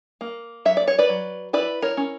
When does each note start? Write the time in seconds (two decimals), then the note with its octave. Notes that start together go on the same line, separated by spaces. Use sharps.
0.21 A#3
0.65 F#3 E5
0.77 D5
0.88 C#5
0.98 B4 D5
1.09 F#3
1.53 E4 B4 D5
1.82 A#4 C#5
1.97 C#4